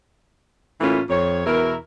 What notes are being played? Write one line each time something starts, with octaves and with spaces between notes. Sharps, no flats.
A2 E3 A3 A#3 C#4 F4
F2 C#5
E2 B2 E4 A#4